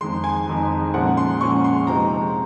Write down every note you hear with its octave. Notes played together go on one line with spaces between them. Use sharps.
F2 D#3 G#3 C6
G#5
F2 D#3 G#3
A#2 F3 G#3 C#4 F#5
C6
A#2 F3 G#3 C#4 C#6
C6
C3 F3 G#3 C4 D#4 A#5